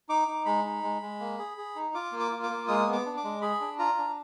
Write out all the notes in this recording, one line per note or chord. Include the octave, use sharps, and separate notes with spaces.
D#4 D6
D#4
G#3 B5
D#4
G#3
G#3
A#3
G#4
G#4
D#4
F4 D6
A#3
D6
F4
D6
A#3
G#3 D#6
B3
D6
D4
D6
G#3
G#4 B5
D4
F4 A#5
D4